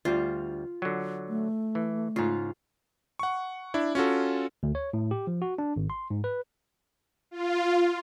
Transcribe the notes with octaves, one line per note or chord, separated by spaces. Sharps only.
D2 G3 F4
D3 F#3
A3
E3
G#2 C#3 F4
F#5 C#6
D4 E4
C#4 F4 F#4 A4
D2
C#5
A2
G4
F3
F#4
D4
G#1
C6
G#2
B4
F4